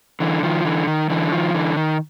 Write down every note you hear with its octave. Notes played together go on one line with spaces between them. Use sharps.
D3 E3
D#3 F3
D3 E3
D#3
D3 E3
D#3 F3
D3 E3
D#3